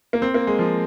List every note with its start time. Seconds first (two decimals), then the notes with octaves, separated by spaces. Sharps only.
0.13 A#3
0.22 C4
0.34 A#3
0.47 G#3
0.59 F3